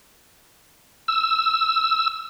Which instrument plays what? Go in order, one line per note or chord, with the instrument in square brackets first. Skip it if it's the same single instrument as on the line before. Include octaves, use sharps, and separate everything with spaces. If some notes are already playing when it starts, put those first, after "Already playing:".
[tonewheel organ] E6